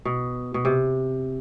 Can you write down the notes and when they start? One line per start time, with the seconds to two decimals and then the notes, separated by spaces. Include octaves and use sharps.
0.05 B2
0.54 B2
0.65 C3